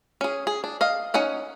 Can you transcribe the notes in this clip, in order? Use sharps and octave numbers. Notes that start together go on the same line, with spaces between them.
C#4 G#4
G#4
D4
D#5 F5
C#4 D#4 F#5 G#5